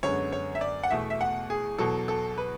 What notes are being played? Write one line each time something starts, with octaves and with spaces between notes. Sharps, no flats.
F#2 D3 G#3 B3 C#5
C#5
E5
D5
F#5
E2 B2 A3 E5
E5
F#5
G#4
E2 B2 F#3 A4
A4
B4